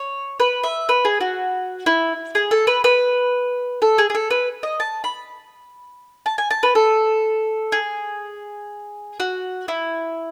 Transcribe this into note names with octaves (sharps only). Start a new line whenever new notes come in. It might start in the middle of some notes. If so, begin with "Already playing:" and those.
Already playing: C#5
B4
E5
B4
G#4
F#4
E4
G#4
A4
B4
B4
A4
G#4
G#4
A4
B4
D#5
A5
B5
A5
G#5
A5
B4
A4
G#4
F#4
E4